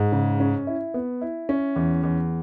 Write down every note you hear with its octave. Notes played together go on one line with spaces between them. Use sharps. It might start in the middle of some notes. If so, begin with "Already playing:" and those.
Already playing: G#2
C#3
C#4
E4
B3
E4
C#4
E2
E2